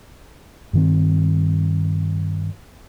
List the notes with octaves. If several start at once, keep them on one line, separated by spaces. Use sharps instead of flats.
G2 D#3 C4